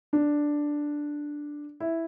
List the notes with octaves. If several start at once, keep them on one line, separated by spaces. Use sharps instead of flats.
D4
E4